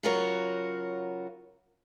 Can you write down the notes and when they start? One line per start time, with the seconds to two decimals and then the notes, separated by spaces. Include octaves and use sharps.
0.03 C#3 F#3 F4 F#4 A#4 C#5